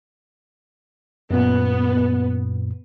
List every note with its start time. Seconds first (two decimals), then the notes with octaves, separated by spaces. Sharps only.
1.31 F#2 A#2 B3